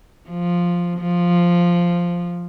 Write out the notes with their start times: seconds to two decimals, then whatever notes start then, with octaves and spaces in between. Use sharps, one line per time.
0.30 F3
1.00 F3